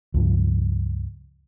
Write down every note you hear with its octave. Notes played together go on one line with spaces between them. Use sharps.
C#2 G2 F3